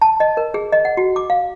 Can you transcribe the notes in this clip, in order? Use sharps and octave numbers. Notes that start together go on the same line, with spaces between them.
A5
D#5
A#4
G#4
D#5
F#5
F#4
D6
F5